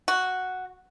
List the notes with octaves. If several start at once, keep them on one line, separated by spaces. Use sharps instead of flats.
F#4